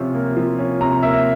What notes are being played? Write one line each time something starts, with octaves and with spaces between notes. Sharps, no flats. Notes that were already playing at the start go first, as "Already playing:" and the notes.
Already playing: C3 F3 C#4
A#3
F3
C#4
C3 A#5
A#3 E5